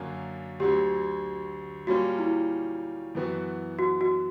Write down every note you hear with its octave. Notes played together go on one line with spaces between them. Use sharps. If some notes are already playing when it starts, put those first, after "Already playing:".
Already playing: F#2 D3 A#3 C#4 F#4
D2 D3 F#3 G4
A#2 G3 A#3 C#4 F#4
E4
F#2 E3 B3 F#4
F#4
F#4